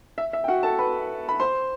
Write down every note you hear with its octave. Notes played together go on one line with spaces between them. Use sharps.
E5
E5
G5
F#4 F#5
A4 A5
B4 B5
B5
C5 C6